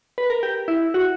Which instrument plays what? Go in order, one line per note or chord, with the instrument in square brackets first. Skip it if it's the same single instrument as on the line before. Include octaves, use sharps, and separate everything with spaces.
[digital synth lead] B4
A#4
G4
E4
F#4